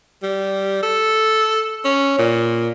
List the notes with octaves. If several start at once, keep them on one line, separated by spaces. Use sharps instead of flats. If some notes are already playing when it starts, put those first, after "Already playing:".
G3
A4
C#4
A#2